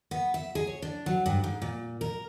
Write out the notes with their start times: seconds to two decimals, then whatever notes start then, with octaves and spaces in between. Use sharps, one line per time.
0.11 B3
0.34 E5
0.55 G#4
0.67 C#5
0.82 D4
1.06 F#3
1.26 G2
1.44 G#2
1.62 A#2
2.01 A#4